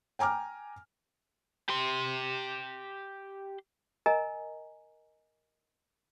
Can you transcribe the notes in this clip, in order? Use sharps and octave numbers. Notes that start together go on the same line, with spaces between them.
G5 G#5 A#5 D6 F6
G4 C6
A#4 D#5 G#5 A#5